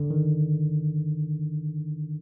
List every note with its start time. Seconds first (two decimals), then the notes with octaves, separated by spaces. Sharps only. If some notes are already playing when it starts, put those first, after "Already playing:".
Already playing: D3
0.10 D#3